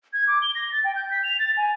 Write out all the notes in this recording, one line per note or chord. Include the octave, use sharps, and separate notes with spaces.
G#6
D6
G7
A#6
A6
G5
G6
B6
F7
A6
G#5